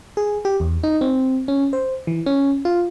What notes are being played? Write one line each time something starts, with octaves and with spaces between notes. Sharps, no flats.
G#4
G4
E2
D#4
C4
C#4
C5
E3
C#4
F4